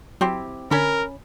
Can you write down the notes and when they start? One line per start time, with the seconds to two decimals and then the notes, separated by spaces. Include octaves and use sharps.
0.21 F#3 C4 E4 G4 C6
0.71 D3 C#4 A#4 B5